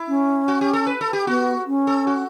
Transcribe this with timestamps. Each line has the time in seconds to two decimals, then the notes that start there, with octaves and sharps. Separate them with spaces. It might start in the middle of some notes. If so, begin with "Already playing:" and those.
Already playing: E4
0.08 C#4
0.48 F#4
0.61 G4
0.73 A4
0.87 B4
1.01 A4
1.13 G4
1.27 B3 F#4
1.66 C#4
1.87 A4
2.07 F#4